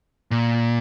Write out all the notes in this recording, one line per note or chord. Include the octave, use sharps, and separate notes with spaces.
A#2